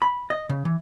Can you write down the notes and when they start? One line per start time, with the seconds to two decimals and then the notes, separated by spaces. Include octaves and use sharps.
0.02 B5
0.30 D#5
0.49 C#3
0.65 E3